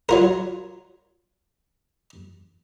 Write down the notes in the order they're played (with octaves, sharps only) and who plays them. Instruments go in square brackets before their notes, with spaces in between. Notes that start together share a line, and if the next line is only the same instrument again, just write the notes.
[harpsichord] F#3 F4 A#4